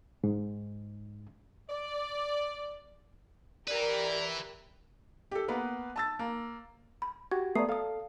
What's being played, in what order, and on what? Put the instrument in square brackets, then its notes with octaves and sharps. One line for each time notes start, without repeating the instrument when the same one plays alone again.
[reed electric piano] G#2
[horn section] D5
[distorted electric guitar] E4 B4 [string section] G4 A#4 [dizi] D5
[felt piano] G4 A4
A#3 B3 B4
A5 E6 A6
A#3
[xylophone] B5
[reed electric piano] F#4 G4 [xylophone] G#6
[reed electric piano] A3 B3 D#6 [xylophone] D5 A#5 C7
[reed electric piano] A4 F5 [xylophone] A5 D#6